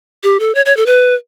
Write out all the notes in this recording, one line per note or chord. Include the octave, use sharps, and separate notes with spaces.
G4
A4
C#5
C#5
A4
B4